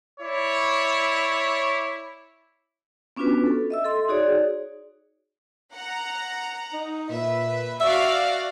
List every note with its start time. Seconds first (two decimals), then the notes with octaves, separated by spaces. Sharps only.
0.19 E4 C#5 D5
3.16 B3 C#4 D4 F4 F#4 B4
3.46 A4
3.70 D#5 E5 E6
3.84 A4 C6
4.08 D#4 F#4 G#4 C#5 D5
5.74 F#5 A#5
6.73 D#4
7.10 A#2 B4 E5
7.81 F#4 D5 E5 F5